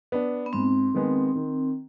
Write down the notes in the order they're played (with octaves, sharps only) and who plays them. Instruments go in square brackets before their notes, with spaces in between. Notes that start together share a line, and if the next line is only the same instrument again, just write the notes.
[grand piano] B3 D4
[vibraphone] B3
[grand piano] G#2 [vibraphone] C4
[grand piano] D#3 G#3 B3
D#3